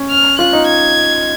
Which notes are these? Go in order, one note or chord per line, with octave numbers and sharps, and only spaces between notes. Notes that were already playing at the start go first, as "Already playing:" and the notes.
Already playing: C#4
F6
F4 F#6
D#4
G#6